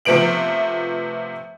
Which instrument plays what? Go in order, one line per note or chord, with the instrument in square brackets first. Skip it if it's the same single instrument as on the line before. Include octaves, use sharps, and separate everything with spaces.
[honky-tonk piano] C3 F3 A3 B3 D7 F#7